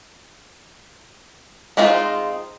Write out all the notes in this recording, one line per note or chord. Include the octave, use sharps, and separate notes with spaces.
G#3 C4 D#4 F4